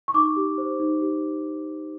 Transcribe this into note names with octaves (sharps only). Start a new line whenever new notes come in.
C#6
D#4 D6
G4
C5
D#4
G4